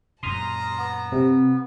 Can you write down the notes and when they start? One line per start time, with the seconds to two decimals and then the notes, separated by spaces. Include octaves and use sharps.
0.23 F#2 A#2 A5 A#5 C6 D#6 F6
0.78 B3
1.12 C3